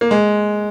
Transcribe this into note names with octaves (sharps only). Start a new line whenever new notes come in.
A#3
G#3